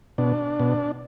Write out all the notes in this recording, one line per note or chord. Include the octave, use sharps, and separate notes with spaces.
B2 D4
B2